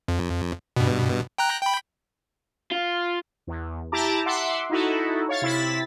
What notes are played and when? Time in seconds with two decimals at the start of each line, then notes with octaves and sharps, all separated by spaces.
0.08 F2
0.76 G2 B2
1.38 G5 A#5 F#6
1.63 G5 B5
2.72 F4
3.47 E2
3.92 E4 G4 A5 A#5 D6
4.26 E5 F#5 C6 D6
4.70 D#4 E4 F#4 A4
5.29 C#5 F5 A6
5.42 C3 E4 A6 B6